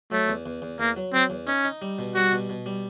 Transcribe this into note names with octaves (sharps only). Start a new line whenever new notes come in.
F#3 A3
E2
E2
E2
E2 A#3
F#3
F#3 C4
E2
C#4 D#4
D#4
G3
B2
G3 F#4
B2
B2
G3